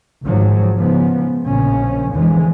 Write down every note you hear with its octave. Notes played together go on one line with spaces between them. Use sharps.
G#1 G#2 F3 F#3
G#2 C#3 F3 B3
A#1 C#3 F3 C#4
E2 D3 E3 F3 G#3